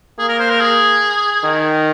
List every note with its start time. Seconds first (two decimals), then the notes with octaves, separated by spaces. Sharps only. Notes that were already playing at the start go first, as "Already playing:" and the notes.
0.18 A#3 G#4
0.28 A#4
0.39 C5
0.50 A#4
0.60 G#4
1.44 D#3